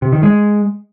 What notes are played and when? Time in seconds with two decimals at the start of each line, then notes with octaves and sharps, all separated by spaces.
0.02 C3
0.13 D#3
0.23 G#3